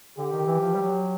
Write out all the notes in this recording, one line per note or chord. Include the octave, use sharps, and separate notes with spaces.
D3 G4
D#3
E3
F3
G3
F#3